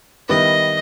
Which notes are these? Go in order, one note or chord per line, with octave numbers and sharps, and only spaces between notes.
D#3 G3 B3 E4 D#5